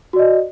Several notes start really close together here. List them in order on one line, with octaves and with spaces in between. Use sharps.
F#4 D5 D#5